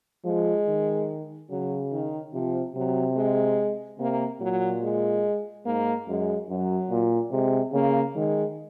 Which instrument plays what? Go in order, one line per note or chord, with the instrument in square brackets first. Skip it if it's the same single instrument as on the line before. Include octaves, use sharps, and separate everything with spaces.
[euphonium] F3 [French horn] G#3
[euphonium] D#3
[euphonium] C#3 [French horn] F#3
[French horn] D#3
[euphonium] C3 [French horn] F3
[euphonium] C3 [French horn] F#3
[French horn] G#3
[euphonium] C3 [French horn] A#3
[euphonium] A#2 [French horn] F#3
[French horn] G#3
[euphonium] G#2 [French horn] A#3
[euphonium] F#2 [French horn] G#3
[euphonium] F#2 [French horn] F#3
[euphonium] A#2
[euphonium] C3 [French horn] G#3
[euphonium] C#3 [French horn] A#3
[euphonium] D#3 [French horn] G#3